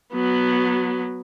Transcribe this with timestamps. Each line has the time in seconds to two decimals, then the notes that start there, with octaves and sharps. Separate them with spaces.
0.14 F#3 B3